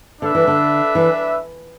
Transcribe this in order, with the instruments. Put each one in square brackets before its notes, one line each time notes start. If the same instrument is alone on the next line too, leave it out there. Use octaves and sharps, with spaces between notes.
[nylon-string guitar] D3 [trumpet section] D4 B4 E5
[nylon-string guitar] E3
D3
E3